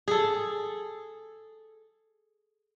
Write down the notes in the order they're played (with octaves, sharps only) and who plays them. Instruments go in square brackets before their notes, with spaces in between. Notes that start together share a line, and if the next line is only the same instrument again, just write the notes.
[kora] G#4 A4